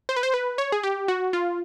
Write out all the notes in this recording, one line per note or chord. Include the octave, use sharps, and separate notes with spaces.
C5
B4
C5
B4
C#5
G#4
G4
F#4
F4